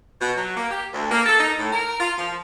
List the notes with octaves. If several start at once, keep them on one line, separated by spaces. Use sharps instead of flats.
B2
F#3
A#3
G4
D2
A#3
A4
D#4
A2
A#4
F4
F3